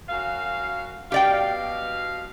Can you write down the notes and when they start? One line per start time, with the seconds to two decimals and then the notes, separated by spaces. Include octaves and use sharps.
0.09 F#2 F#4 F5
1.12 B2 G4 D5 F5 G5